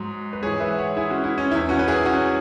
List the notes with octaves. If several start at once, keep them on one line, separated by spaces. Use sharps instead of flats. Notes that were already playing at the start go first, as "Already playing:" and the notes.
Already playing: G#2 F#3
B4
G#2 E3 G#4 C#5
B4 E5
C#5 F#5
E4 G#4
C#4 F#4
E4
C#4
E2 E3 E4
C#4 F#4
B4
E4 G#4
C#4 F#4